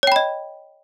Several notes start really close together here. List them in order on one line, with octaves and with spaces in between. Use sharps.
C#5 G5 B5 D#5